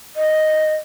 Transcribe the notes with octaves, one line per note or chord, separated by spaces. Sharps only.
D#5